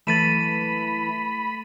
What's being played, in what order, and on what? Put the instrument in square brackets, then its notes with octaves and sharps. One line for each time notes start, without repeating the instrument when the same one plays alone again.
[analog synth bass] E3 [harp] A3 [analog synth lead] B5 [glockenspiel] A6 D#7 E7